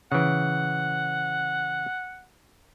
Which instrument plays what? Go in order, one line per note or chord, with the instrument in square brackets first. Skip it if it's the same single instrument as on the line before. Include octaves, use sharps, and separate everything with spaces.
[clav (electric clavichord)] C#3 E3 [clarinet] F#5